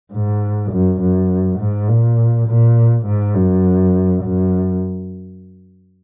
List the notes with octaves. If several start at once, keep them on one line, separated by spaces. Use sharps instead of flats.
G#2
F#2
F#2
G#2
A#2
A#2
G#2
F#2
F#2